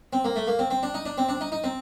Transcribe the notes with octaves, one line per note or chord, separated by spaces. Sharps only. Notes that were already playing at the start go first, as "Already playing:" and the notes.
C4
A#3
A3
A#3
C4
C4
D4
D#4
D4
C4
D4
D#4
D#4
C4